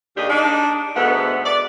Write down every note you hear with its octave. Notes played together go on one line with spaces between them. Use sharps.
D#2 C#3 D4 G4 D#5
D4 D#4
D2 G#2 A3 B3 F#5
D5